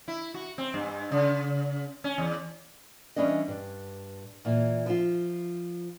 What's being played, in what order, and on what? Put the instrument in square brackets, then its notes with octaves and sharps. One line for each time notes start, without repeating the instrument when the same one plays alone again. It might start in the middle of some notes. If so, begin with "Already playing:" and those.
[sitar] E4
F#4
C4
G2
C#3
C#4
E2
[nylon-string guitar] E3 G3 C#4 D4 D#5
G2
A#2 E3
F3 F4